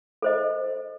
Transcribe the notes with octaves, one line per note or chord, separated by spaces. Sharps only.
A4 C5 D#5